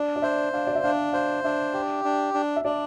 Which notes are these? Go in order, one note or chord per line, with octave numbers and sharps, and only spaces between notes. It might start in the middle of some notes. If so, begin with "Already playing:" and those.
Already playing: D4 D5
D5
C5 E5
D4 F5
D5
E5
D4 F5
C5 F5
D4 E5
G4
D4
D4
E5
D4 D5